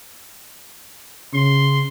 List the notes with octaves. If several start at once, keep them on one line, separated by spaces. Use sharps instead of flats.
C#3 C6